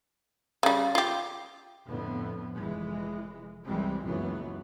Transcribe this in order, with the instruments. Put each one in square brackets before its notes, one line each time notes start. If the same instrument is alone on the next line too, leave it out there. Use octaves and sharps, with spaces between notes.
[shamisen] C#3 G3
F4 G4
[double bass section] F2 A2 D3 B3
F1 E3 G#3
C2 E3 G3 G#3 C4
F#1 C#2 F#2 E3 F#3 B3